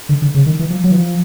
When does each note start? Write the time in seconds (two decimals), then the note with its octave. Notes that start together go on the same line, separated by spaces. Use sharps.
0.09 D3
0.22 D3
0.35 C#3
0.46 D#3
0.59 E3
0.70 F3
0.84 F#3
0.91 E3
0.96 F3